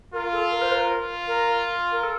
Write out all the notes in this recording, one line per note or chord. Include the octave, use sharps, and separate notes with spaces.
F4 A#4
A4
A#4
C5
A#4
F4
A#4
A#4
A4